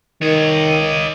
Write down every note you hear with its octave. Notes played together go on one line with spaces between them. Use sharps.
D#3 C#5 D#5